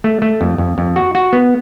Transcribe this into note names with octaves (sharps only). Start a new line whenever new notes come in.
A3
A3
F2
F2
F2
F#4
F#4
B3